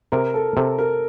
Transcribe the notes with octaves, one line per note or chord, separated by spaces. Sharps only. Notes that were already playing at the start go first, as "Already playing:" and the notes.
C3 A#4
A4
C3 A4
A#4